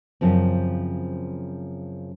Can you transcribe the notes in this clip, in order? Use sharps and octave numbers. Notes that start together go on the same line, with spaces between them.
F#2 C#3 F3 C4